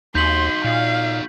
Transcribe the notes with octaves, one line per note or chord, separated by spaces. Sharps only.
D#2 D#4 F#4 C6 G6 B6 F#7
A#2 F5